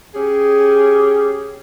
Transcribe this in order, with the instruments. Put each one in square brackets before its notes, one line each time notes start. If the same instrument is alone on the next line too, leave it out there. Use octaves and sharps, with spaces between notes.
[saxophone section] C#4 G4 G#4